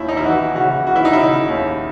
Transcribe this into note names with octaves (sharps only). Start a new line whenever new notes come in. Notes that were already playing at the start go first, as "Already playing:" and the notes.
Already playing: D#2 E4
D#4
E4
E3 F#4
C#3 F#4
E3 F#4
E4
D#4
C#3 E4
D#2